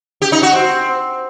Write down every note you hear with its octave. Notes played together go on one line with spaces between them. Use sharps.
G4
D#4
F#4
C4